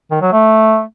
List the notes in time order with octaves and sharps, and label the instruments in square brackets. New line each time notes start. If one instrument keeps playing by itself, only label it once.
[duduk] D#3
F#3
A3